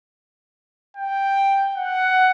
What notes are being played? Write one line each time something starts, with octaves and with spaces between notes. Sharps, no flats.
G5
F#5